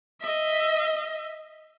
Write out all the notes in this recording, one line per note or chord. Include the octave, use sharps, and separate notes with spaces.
D#5 E5